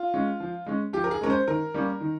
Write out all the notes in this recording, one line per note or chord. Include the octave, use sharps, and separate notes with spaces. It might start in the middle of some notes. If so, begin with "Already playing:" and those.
Already playing: F4
G#3 C#4
F3
G#3 C#4
F3 G4
A#4
G#4
G#3 C#4 A#4
C5
D#3 A#4
G3 A#3 C#4
D#3